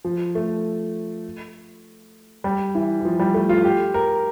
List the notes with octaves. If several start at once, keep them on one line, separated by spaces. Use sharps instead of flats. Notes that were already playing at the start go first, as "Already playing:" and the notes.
F3
A3
G3
E3
E3
F3
G3
A3
F4
G4
A#4